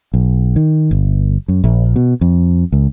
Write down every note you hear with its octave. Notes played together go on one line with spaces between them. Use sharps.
B1
D#3
G1
F#2
A#1
B2
F2
C#2